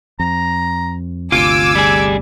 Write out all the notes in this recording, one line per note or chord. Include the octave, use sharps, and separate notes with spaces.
F2 A#5
G1 D2 C3 F4 G#5 D6 E6
G3 G#4